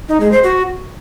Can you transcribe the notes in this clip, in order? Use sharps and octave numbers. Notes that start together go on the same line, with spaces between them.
D#4
G#3
C5
F#4